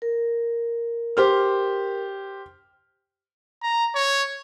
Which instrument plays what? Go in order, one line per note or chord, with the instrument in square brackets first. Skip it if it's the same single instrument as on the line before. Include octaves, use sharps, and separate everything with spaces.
[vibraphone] A#4
[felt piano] G4 C5 F6
[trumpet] A#5
C#5